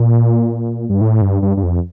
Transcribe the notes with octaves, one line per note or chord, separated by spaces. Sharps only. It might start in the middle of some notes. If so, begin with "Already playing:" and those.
Already playing: A#2
G2
A2
G2
G2
G2
F2